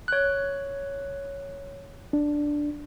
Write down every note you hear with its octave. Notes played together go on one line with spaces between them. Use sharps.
C#5 F#6
D4